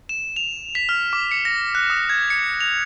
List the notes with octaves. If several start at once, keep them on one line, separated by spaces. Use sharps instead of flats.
E7
F7
B6
F6
D6
C#7
A#6
F#6
D#6
G#6
C#7
F7